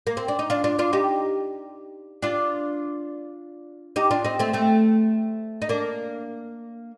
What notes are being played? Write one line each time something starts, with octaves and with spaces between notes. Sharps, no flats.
A#3
C4
D4
D#4
D4 F4
D4 F4
D4 F4
D#4 G4
D4 F4
D#4 G4
D4 F4
C4 D#4
A3 C4
A3 C4
D#4
A#3 D4